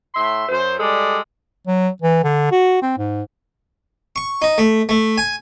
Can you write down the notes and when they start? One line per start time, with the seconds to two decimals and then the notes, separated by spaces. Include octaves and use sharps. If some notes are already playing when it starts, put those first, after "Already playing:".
0.15 A2 E5 C6
0.49 F#2 C5
0.80 G3 G#3 A4 D5
1.67 F#3
2.02 E3
2.24 D3
2.52 F#4
2.82 C4
2.98 G#2
4.16 C#6
4.42 D#4
4.58 A3
4.89 A3
5.18 G#5